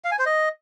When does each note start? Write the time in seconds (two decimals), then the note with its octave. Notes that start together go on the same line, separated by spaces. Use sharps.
0.04 F5
0.12 G#5
0.19 C5
0.26 D#5